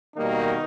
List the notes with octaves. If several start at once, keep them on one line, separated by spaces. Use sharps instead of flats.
B2 D#3 G3 A#3 D#4